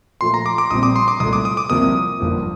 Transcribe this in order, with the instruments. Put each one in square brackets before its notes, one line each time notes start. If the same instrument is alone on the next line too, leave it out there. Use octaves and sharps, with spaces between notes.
[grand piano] A#2 F3 A3 [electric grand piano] C6
[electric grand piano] A#5
D6
D6
[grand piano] A#1 A#2 G3 C4 [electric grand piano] D#6
[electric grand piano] D6
C6
D6
[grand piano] C2 A#2 A3 [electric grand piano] D#6
[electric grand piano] D6
D#6
D6
[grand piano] C2 C3 F3 A#3 [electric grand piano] D#6
[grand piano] G1 G2 F3 A#3